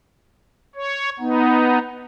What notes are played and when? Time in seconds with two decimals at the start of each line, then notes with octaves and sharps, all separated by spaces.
0.76 C#5
1.20 B3 D#4